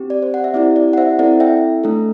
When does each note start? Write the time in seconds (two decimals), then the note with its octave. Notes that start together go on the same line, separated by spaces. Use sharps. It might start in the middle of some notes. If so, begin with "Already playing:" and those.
Already playing: C4 G4
0.10 D5
0.22 C5
0.34 F#5
0.44 E5
0.54 C4 E4 G4 D5
0.76 D5
0.93 F#5
0.97 C5 E5
1.19 C4 E4 A4 D5 F#5
1.40 E5 G5
1.84 A3 D4 A4